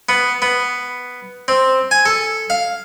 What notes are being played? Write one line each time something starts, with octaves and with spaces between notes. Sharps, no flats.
B3
B3
C4
G#5
A4
F5